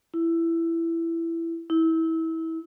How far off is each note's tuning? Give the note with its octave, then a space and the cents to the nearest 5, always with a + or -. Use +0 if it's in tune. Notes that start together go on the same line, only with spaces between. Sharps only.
E4 +15
E4 -25